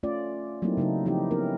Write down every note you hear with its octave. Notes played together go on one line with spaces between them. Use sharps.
A3 C#4 F4 D5
F#3 A3 A#3 C4 D#4 E4
C#3 F#3 D#4 E4 A4
F3 C4 D#4 E4 G4
B3 C#4 E4 A#4